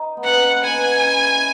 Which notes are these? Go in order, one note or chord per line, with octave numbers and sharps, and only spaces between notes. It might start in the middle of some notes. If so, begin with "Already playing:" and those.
Already playing: D#4
B3
A#3 C#4 F#5
B3 D#4 G#5
C#4 E4